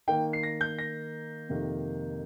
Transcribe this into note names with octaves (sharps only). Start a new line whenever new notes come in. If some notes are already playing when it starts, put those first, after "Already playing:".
D#3 A#3 D#4 G5
C7
A#6
G6
A#6
F2 C3 D#3 A#3 D#4